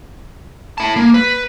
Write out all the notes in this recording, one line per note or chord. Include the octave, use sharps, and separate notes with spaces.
E4 A5
A#3
B4